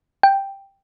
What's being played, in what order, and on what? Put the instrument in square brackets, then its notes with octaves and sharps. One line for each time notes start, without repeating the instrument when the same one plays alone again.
[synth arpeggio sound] G5